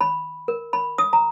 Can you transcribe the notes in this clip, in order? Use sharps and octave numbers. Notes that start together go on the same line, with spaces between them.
B5
A#4
B5
D#6
A#5